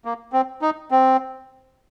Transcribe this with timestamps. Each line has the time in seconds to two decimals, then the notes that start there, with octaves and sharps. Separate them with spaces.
0.05 A#3
0.33 C4
0.62 D#4
0.91 C4